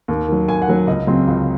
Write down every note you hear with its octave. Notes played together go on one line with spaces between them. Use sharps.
D#2
D#3 F#3
D#2 G#5
F#5
D#3 F#3
C#2 D#5
C#3 F#3 C4
C#2